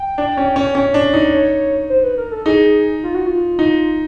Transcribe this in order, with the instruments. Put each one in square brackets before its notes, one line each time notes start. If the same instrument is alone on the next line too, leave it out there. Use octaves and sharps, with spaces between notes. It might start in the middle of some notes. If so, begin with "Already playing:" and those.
Already playing: [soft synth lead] G5
[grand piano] D4
C#4
C#4
C#4
D4
D#4
[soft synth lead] C#5
C5
B4
A#4
A4
[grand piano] D#4 [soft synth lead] G#4
[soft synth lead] F4
F#4
F4
[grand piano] D#4